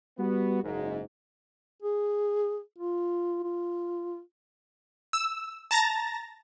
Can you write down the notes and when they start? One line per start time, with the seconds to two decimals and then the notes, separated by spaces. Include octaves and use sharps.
0.18 G3 B3 F#4
0.63 F#1 G#2
1.82 G#4
2.78 F4
3.43 F4
5.13 E6
5.71 A5 A#5 A6 A#6